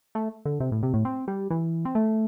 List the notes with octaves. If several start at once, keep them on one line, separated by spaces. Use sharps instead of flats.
A3
D3
C3
A2
C3
A2
C4
G3
E3
C4
A3